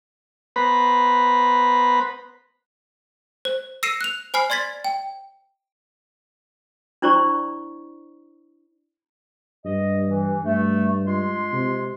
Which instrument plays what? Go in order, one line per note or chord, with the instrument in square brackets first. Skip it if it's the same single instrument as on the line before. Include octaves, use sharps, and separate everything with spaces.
[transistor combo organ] B3 B4 C5 A#5 B5
[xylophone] C5
E6 A#6 C7 C#7 D#7 E7
F#6 F7
C5 G#5 B5 F6 C7
D5 C6 G#6 A6 B6
G5
[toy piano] D4 E4 C5 D5 A#5 C#6
[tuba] G2 [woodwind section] D#5
[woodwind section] E3
[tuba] G2 [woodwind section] A3
[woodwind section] G#3 F4 C6
[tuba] C3